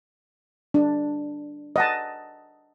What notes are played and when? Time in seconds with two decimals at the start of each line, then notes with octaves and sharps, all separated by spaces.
0.74 D4
1.76 D#5 F#5 A5